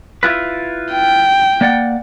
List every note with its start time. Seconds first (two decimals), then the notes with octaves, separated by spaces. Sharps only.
0.23 E4 F4 B4
0.93 G5
1.61 A#3 D5 F#5